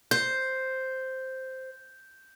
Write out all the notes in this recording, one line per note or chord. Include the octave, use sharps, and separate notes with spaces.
C5 G6